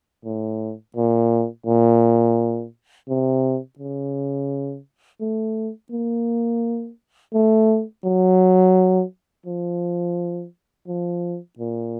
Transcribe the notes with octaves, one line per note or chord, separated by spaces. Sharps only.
A2
A#2
A#2
C3
C#3
A3
A#3
A3
F#3
F3
F3
A#2